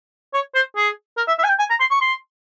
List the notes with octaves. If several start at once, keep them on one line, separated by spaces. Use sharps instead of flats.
C#5
C5
G#4
A#4
E5
E5
G#5
G5
G#5
A#5
C6
C#6
C6